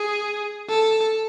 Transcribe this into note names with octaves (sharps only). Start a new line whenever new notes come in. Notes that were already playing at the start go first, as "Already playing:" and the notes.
Already playing: G#4
A4